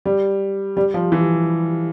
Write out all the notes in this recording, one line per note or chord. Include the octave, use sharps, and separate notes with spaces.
G3
G3
F3
E3